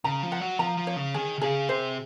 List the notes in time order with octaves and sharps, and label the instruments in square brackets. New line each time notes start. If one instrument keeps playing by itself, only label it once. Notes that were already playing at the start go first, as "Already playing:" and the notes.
[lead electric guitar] C#3 [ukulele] A#5
[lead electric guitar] F3
[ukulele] F#5
[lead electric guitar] F#3
[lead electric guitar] F3 [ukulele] A#5
[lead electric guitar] F3
[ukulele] C#5
[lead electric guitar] C#3
[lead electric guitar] D#3 [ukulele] G#4
[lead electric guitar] C3
[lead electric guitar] C#3 [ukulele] G#4
[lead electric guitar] C3 [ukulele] C5